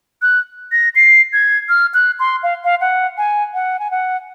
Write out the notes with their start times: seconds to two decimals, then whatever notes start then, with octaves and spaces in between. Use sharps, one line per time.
0.22 F#6
0.72 A#6
0.96 C7
1.33 G#6
1.69 F6
1.94 F#6
2.19 C6
2.43 F5
2.64 F5
2.81 F#5
3.18 G#5
3.54 F#5
3.79 G#5
3.91 F#5